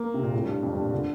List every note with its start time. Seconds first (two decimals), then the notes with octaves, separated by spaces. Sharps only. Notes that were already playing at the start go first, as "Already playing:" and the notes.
Already playing: A#3
0.14 C3
0.23 A#2
0.33 A2
0.44 G2
0.63 F2
0.73 G2
0.82 A#2
0.92 D3